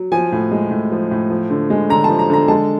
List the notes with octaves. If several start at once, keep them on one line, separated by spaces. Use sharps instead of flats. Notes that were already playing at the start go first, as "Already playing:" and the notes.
Already playing: F#3
F3 G#5
A2
G#3
A2
F3
A2
F3
D3
G#3
D3 A#5
A5
F3
A#5
D3 A#5
G#3 A5